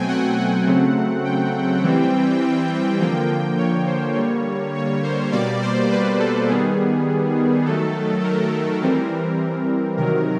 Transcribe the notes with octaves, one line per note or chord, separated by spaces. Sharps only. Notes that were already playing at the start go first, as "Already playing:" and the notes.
Already playing: B2 F#3 A3 C4 G5 G#5
F#5
F#5
C#3 F#3 A3 C4
G5
E3 G3 C4
D3 F3 A#3
C#5
C5
D3 G3 A#3 C#5
C#5
C5
B2 G3 A#3 D5
C5
B4
A4
D#3 G3 B3 G#4
D#3 F#3 A3 A4
A#4
E3 G3 C4
C3 D#3 F#3 A#4